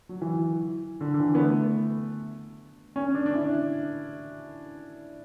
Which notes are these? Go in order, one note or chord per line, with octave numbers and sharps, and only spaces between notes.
F#3
E3
D3
D3
E3
B3
A3
C#4
D4
D4
E4